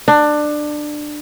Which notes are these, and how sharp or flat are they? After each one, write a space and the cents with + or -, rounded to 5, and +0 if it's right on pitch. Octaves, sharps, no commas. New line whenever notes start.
D4 +20